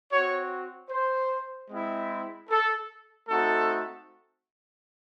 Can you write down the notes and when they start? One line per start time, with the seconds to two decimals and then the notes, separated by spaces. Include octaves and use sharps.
0.12 F#4 C#5
0.17 C4
0.91 C5
1.70 G#3 C4 E4
2.50 A4
3.28 A3 C4 D#4 F#4 A4